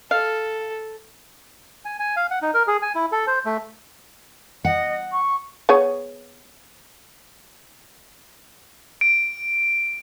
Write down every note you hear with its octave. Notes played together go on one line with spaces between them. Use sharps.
A4 F5
G#5
G#5
F5
F#5
D#4
A#4
G#4
G#5
E4
A4
C5
A3
D#5 F#5
C#6
B3 G#4 C#5
D7